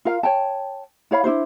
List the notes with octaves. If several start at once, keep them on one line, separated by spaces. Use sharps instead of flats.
F4 A#4 F5
C#5 G5 A5
E4 C#5 F5 B5
D4 E4 F4 C5